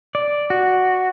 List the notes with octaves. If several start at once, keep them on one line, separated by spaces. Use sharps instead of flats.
D5
F#4